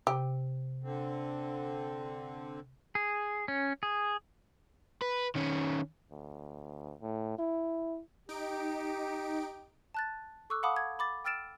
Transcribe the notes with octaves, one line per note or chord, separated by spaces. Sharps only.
C3 G4
D3 C4
G#4
C#4
G#4
B4
D#3 C#4
D2
A2
E4
D#4 G4 D7
A5 F#6 A6
A4 C#6 D6 E6 F#6
F5 F#5 A5 B5 D6 D#6
G#6
B5 D6 A6
G5 E6 F6 A6 D7 E7